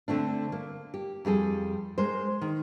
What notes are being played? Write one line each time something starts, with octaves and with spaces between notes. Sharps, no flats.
D3 A3 C4 D4
A#3
G4
F2 G3 G#4 A4
G#3 A#4 C5
D#3